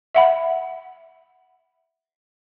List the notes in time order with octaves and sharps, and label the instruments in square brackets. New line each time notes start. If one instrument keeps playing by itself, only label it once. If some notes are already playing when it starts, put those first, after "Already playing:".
[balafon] E5 F#5 B5